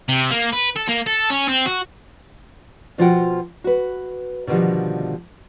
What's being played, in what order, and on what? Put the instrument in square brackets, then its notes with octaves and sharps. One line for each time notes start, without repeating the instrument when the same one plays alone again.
[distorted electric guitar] C3
A#3
B4
A4
A#3
A4
C#4
C4
F#4
[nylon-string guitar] B2 F3 F4 F#4 F#5 G5
F#4 B4
B2 D3 D#3 F3 G3